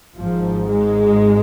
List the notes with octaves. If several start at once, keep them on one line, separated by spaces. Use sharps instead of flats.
G#1 G#2 F3
G#3